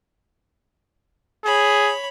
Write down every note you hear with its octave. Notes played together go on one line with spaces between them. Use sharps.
G#4 C#5 B5